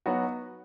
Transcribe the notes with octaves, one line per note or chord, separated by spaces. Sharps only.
F#3 B3 D#4 F#4